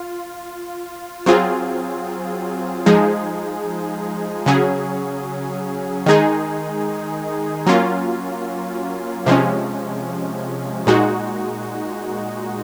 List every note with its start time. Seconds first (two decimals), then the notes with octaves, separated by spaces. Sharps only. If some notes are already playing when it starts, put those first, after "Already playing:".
Already playing: F4
1.26 F#3 C4 F4 G#4
2.86 F3 G#3 D#4 G#4
4.46 C#3 F#3 C#4 G#4
6.06 D#3 G#3 D#4 G#4
7.66 F#3 A#3 C#4 F4
9.26 C3 F3 G#3 C#4
10.87 A#2 G#3 D#4 F#4